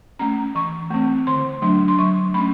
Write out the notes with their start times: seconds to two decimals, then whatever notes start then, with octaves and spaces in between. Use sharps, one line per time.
0.19 A3 C#4 A#5
0.55 E3 C#6
0.90 A3 C4
1.27 D3 C6
1.62 F#3 A3 D4 C6
1.88 C6
1.98 F#3 C#6
2.34 A3 C#4 B5